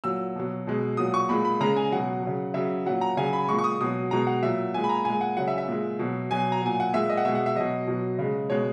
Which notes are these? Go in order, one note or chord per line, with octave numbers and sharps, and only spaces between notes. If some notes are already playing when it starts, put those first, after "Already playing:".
A#2 F#3 E6
B2 F#3
B2 G#3
A#2 F#3 D#6
C#6
A#2 G#3 B5
B5
C#3 G#3 A#5
G#5
B2 F#3 F#5
C#3 F#3
C#3 F#3 E5
A#2 F#3 F#5
A#5
C#3 F#3 G#5
B5
A#2 G#3 C#6
C#6
D#6
B2 F#3 D#6
B2 G#3 A#5
F#5
A#2 F#3 E5
A#2 G#3 G#5
B5
A#5
A#2 G#3 G#5
F#5
C#3 F#3 F#5
E5
E5
A#2 G#3
B2 F#3
B2 F#3 G#5
A#5
A#2 F#3 G#5
F#5
A#2 G#3 E5
D#5
F#5
B2 G#3 E5
F#5
E5
B2 F#3 D#5
B2 F#3
C#3 G#3
B2 G#3 C#5